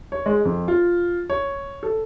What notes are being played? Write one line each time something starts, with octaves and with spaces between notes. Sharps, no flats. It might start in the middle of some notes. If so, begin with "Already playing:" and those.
C#5
G#3
F2
F4
C#5
A4